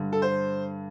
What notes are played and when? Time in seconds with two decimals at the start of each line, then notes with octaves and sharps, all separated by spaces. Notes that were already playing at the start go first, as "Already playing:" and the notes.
Already playing: G2 D3
0.13 A4
0.22 C5